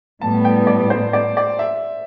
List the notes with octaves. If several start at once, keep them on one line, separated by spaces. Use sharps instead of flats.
A2 G3 B3 A5
G5
D5
C5
D5
D5
E5